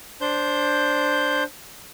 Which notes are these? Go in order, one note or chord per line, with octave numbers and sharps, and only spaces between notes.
D4 C5 G6